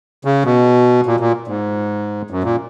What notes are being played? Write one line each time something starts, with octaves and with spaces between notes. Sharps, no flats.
C#3
B2
A#2
A#2
G#2
F#2
A#2